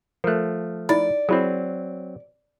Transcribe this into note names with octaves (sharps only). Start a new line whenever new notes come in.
F3 A3 A#4 F#6
D#4 E4 D5 A6
F#3 C4 E4 G#4